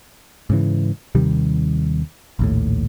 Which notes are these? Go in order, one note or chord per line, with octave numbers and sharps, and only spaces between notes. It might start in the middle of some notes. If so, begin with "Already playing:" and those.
G#2 C#3 E3
D#2 C3 D#3 G3
A#1 D#2 A2